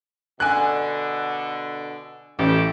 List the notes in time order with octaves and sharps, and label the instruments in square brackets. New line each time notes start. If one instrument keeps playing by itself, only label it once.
[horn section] B2 D3 [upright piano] G#5 F#6
[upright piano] A1 [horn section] G3 A3 G4